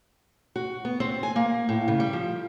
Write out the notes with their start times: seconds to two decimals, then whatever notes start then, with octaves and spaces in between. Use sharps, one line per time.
0.56 F#4
0.85 B3
1.00 C4
1.23 G#5
1.36 A#3
1.69 A2
1.88 C#3
2.00 G3
2.13 F3